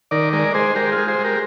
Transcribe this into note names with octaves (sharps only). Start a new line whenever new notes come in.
D#3 A#4 D5
G#3 A#4 D5
G#3 G#4 C5
G#3 G4 A#4
F4 G#4
G#3
G#4 C5
G#3
G4 A#4